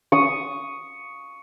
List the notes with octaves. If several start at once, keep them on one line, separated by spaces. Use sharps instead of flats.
C#6 D#6